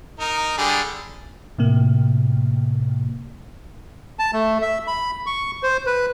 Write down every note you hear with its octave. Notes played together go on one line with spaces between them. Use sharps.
D#4 A#4
D3 G3 G#4
A2 C3 A#3
A5
A3
E5
B5
C#6
C5
B4